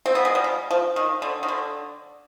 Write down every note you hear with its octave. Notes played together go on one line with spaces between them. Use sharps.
C4
B3
G#3
G3
F3
F3
D#3
D3
D#3
D3